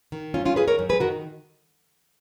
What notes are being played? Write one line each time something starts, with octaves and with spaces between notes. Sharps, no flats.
D#3
F#2 C#4 F4
C#4 F4
D#3 G#4 B4
A#4 C#5
F#2
G#4 B4
D#3 F#4 A#4